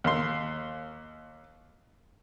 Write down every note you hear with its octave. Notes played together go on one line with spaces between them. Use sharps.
D#2 C6